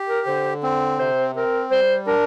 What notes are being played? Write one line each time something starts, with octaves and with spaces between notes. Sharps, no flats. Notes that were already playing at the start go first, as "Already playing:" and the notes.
Already playing: G4
A#4
D3 C5
C4
C3 C5
C4 A#4
G3 C5
D4 A#4